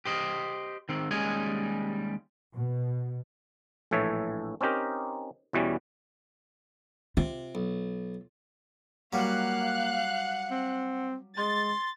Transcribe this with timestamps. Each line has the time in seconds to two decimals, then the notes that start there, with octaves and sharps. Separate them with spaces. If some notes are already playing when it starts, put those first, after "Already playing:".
0.05 G4 C5 D#5
0.89 D#3 C4
1.11 D#2 G3 G#3 C#4 D#5 G#5
2.53 B2
3.91 A#1 A2 E3 A4 C#5 E5
4.61 C4 C#4 D#4 G4 A#4
5.53 E2 B2 E3 G3 C#4
7.17 C3 F4
7.55 B1
9.13 F#3 G3 A#3 F5 F#5 F#6
10.51 C4
11.37 G#3 C6 A6